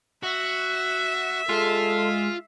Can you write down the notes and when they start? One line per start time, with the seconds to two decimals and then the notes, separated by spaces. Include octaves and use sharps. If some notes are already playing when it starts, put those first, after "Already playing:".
0.24 F#4 E5
1.49 G#3 F4 A4